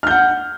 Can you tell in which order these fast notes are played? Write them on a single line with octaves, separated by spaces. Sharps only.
F6 G6 F#5